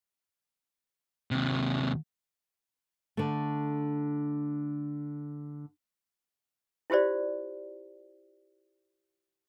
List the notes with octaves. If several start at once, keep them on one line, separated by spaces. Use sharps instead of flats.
D#2 C3
D3 A3
E4 F4 G4 C5 D5